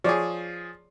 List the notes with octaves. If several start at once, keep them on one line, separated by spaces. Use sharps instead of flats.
F3 G#4 C#5 D5